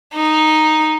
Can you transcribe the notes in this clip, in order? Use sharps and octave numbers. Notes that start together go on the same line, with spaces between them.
D#4